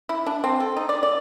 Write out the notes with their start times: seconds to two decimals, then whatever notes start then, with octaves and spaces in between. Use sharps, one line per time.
0.09 E4
0.26 D4
0.44 C4
0.60 A4
0.77 D#4
0.89 D5
1.03 D5